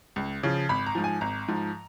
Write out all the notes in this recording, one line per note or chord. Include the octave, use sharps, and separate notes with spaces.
C#2
C#3 F3
G#1 B5
A#5
G#2 F3
G#5
G#1 A#5
G#2 F3